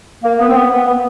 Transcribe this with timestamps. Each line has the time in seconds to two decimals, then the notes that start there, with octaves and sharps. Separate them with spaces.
0.23 A#3
0.39 B3
0.48 C4
0.55 B3
0.71 B3
0.86 B3